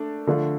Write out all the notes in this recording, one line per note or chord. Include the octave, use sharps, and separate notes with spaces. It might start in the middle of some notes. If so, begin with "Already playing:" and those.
Already playing: A3 D4
D3 F3 A3 D4 F4